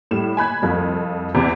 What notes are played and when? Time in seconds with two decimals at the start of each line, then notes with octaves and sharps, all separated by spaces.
0.11 A2 G3 E7
0.37 G#5 B5 F#6 G#6
0.62 C2 F2 F3
1.34 E2 C3